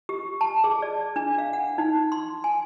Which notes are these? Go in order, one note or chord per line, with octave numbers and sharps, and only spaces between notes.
G4
A5
G#4
D5
D4
F5
F#5
D#4
C6
G#5